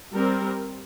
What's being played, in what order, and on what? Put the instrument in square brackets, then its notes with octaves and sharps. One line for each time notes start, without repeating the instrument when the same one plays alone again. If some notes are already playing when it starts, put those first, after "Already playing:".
[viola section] G3 C4 A#4